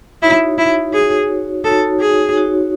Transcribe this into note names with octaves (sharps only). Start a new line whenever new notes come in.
D#4 E4 F#4 C#5
E4
D#4 F#4 G#4 C#5
D#4 F#4 A4 C#5
G#4
D#4 F#4 C#5